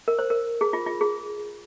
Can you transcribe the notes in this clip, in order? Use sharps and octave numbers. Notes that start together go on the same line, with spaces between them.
A#4
C5
A#4
G#4
F4
F4
G#4